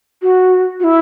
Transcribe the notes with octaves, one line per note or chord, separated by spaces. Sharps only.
F#4
F#4
E4